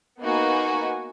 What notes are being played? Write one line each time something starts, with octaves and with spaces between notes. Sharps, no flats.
A#3 B3 D#4 F#4 B4 G#5